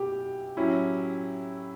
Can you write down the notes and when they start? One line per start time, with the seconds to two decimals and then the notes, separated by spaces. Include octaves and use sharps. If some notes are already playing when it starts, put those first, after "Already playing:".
Already playing: B1 B2 E4 G4
0.57 A2 F#3 C#4 E4